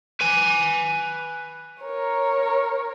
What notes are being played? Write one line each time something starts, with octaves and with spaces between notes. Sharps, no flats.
B4 G#5
A#4 C#5